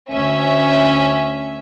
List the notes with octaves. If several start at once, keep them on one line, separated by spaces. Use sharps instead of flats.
D2 C#4 E5